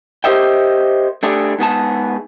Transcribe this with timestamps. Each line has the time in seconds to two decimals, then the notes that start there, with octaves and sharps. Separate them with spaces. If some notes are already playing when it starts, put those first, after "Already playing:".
0.24 G4 A#4 C5 D#5 E5 G5
1.23 A3 D4 G4 G#4
1.59 G#2 B3 G#4 A5